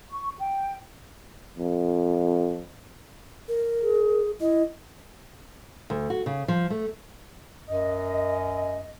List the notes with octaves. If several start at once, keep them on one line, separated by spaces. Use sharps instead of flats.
C#6
G5
F2
A#4
G#4
E4 D#5
D2
F#4
C#3
F3
A3
F#2 D#5